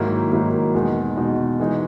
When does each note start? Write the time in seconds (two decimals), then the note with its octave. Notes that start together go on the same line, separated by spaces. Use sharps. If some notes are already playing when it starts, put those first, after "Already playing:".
Already playing: G#2 D#3 F#3 A#3 E4
0.32 G#2 D#3 F#3 A#3 E4
0.74 E2 B2 G#3 D#4
1.16 E2 B2 G#3 D#4
1.59 E3 G#3 D#4 F#4